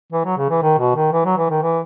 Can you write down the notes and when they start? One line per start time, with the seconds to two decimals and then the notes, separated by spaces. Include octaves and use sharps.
0.12 E3
0.25 F#3
0.38 C#3
0.50 E3
0.62 D#3
0.79 B2
0.96 D#3
1.13 E3
1.25 F#3
1.38 E3
1.50 D#3
1.62 E3